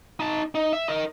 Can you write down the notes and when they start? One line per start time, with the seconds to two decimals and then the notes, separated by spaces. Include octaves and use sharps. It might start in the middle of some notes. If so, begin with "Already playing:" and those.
0.20 D#4 A5
0.55 D#4
0.73 E5
0.89 A#4 D#5